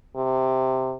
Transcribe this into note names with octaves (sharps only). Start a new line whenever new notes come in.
C3